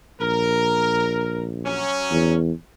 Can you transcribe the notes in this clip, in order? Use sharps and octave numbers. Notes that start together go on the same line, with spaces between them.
A#1 A#4
F#3 C#4
E2